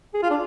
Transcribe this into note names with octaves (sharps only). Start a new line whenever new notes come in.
G#4
F4
D4